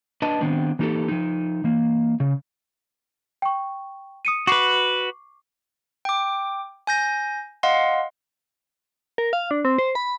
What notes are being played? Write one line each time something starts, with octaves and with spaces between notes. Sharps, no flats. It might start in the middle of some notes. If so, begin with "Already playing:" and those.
D4 B4 D#5 A5
D#3 B3 C4 D4
E3 A#3 D#4 F#4 G4 A4
F3 D#4
E3 A#3
C#3
G5 C#6
D#6 C#7 D#7
F#4 B4 C#6 D6 C7
G5 D6
G#5 G6 A#6
D#5 F5 F#5 C6
A#4
F5
D4
C4
C5
B5